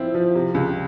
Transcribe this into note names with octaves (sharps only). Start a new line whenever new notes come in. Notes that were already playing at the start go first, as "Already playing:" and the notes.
Already playing: F3 C4 E4
F3
C3
C#2